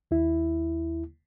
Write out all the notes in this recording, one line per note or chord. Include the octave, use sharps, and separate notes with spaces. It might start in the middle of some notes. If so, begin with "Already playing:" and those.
D#2 E4